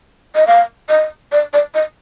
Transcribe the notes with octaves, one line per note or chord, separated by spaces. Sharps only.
D#5
F5
D#5
D5
D5
D#5